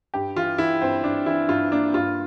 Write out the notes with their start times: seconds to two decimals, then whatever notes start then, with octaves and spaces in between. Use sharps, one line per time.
0.14 G2 G4
0.36 E3 F4
0.58 E3 E4
0.81 G2 C4
1.04 G2 D4
1.26 E3 E4
1.48 G2 F4
1.71 A#3 D4
1.93 G2 F4